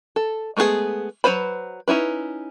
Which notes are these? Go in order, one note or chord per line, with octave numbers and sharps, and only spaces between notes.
A4
G#3 A3 B3 E4 G#4
F#3 F#4 B4 C5 B5
C#4 D#4 E4 B4